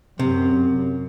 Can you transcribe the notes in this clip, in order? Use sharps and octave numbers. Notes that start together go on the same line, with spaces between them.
F#2 C3